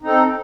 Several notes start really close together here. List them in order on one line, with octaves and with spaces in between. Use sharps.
D#4 C4 A4